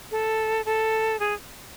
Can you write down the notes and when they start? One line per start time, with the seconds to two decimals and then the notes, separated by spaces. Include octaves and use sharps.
0.11 A4
0.66 A4
1.20 G#4